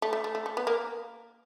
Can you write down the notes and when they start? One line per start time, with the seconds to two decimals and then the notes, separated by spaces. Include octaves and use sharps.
0.02 A3
0.13 A3
0.24 A3
0.35 A3
0.46 A3
0.57 B3
0.67 A#3